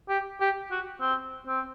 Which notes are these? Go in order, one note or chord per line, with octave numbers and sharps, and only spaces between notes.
G4
G4
F#4
C4
C4